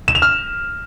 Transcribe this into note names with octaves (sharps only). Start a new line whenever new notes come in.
E7
F7
F6